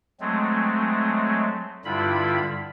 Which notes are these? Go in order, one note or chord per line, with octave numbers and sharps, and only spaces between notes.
F#3 G#3 A3 C4
G2 D3 G3 E4 F4 B5